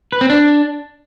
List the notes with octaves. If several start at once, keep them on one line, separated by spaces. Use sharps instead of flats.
B4
C4
D4